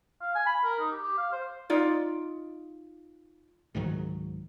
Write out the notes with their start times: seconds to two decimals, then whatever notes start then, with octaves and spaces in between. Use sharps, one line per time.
0.22 F5
0.35 G#5
0.46 B5
0.64 A#4
0.79 D#4
0.92 G4
1.03 G4
1.17 F5
1.32 C5
1.70 D#4 F4 D5
3.75 C#2 G#2 D#3 F#3